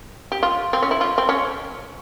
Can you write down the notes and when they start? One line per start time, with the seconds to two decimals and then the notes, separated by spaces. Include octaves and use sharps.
0.32 G4
0.43 F4
0.73 C4
0.82 C#4
0.91 E4
1.01 F4
1.18 C4
1.29 C#4